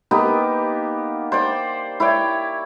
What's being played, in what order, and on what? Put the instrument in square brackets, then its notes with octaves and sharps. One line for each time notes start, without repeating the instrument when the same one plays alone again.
[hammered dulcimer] A#3 B3 D#4 G4
C5 D5 G5
E4 C#5 D5 G5